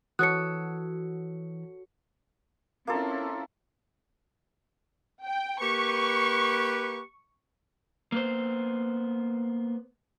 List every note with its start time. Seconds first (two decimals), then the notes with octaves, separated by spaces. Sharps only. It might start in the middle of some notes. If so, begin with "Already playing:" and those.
0.19 E3 F#4 A4 C#5 D#6 F#6 C#7
2.87 A#3 C4 C#4 E4 F4 A4
5.25 G5
5.61 A#3 G4 B4 C#6
8.12 A#3 B3 C5